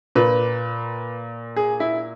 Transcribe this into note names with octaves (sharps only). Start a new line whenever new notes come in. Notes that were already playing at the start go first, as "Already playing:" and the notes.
A#2 B4
G#4
E4